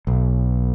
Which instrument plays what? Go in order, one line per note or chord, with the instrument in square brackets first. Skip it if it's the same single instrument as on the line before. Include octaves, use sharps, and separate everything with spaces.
[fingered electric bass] B1